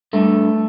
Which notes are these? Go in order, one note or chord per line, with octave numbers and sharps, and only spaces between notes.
G2 A3